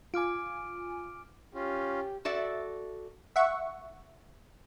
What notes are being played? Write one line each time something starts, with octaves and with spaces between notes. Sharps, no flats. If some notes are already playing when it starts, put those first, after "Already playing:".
F4 G#5 D6 F6 D7
C#4 F4 G4
F#4 A4 D5 E5
E5 F#5 C#6